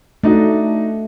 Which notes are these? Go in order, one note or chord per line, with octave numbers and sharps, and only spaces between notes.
A3 D4 D#4 F#4